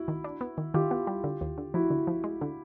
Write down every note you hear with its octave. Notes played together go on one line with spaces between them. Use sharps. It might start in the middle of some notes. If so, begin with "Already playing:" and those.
Already playing: E4 F#4
D#3
D4
B3
D#3
D#3 F4 G4
B3
G3
D3
D#2
D3
F3 E4 F#4
D3
F3
G#3
D3